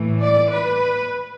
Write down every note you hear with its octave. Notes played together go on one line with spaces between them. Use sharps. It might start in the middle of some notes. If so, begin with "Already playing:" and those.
Already playing: A2 E3 A3
D5
B4